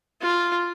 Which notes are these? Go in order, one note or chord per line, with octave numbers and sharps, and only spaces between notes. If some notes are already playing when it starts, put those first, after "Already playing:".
F4